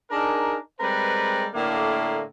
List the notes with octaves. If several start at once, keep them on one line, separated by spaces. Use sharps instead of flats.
D4 D#4 G#4 A#4
G3 G#3 C4 A#4 B4
A2 D3 A3 A#3